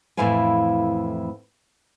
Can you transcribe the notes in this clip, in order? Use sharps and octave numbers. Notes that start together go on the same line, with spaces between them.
F2 A2 E3 E4 F5 G#5